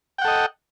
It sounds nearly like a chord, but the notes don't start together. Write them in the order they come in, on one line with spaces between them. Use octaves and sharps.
G5 F#5 A4 D#5